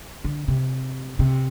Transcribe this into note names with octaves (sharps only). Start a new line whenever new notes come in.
D3
C3
C3